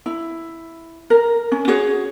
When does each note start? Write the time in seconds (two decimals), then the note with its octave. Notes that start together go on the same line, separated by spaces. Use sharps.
0.06 E4
1.10 A#4
1.52 C#4
1.68 F#4 G#4 C#5